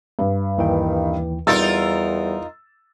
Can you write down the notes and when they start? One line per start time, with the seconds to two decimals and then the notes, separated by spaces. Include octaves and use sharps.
0.19 G2
0.58 D#2 D#3 E3 G5
1.47 E2 G3 D#4 F4 A#4 E6 A6